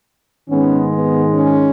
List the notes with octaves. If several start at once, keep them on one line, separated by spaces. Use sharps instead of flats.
G#2 D#3 G#3 B3 C#4
B3
C#4